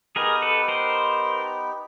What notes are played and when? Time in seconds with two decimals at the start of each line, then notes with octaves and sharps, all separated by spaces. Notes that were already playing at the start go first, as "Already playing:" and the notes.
0.16 B3 D#4 G4 G#4 A#4
0.42 A4 B4
0.68 A#4 C5